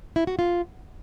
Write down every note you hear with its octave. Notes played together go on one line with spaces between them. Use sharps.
E4
F#4
F4